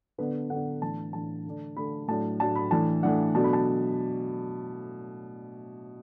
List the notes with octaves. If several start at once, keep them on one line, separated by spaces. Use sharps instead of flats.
D3 B3 D4 B4
D3 B3 D4 F#5
A2 E3 D4 A5
A2 E3 D4 A5
D3 A3 D4
D3 A3 D4 B5
A2 F#3 D4 A5
A2 F#3 D4 A5
B5
A2 E3 D4 A5
A2 E3 D4 F#5
B2 F#3 A3 D4 A5
B5
A5